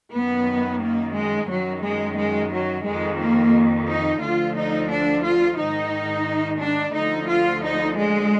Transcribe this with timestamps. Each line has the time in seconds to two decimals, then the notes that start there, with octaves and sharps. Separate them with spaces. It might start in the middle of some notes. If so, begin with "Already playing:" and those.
0.13 F#2 D#3 B3
0.81 A#3
1.16 G#3
1.50 F#2 D#3 F#3
1.84 G#3
2.18 G#3
2.53 F#3
2.86 F2 D#3 G#3
3.20 A#3
3.88 D#4
4.23 D2 D3 F3 F4
4.56 D#4
4.91 D4
5.25 F4
5.59 G#2 D#3 D#4
6.61 D4
6.95 D2 D3 F3 D#4
7.29 F4
7.63 D#4
7.98 G#3